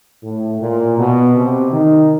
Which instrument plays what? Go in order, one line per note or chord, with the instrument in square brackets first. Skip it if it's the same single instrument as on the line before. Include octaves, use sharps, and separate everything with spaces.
[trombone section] A2
A#2
B2
C3
D#3